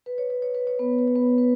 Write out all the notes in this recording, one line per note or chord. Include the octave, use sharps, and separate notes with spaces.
B4
C#5
B4
C#5
B4
C#5
B3 B4
B4
C#5
B3 B4
B4